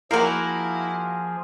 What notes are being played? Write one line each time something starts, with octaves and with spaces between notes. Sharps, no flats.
F3 A#3 E4 F#4 G#4 A#4 F5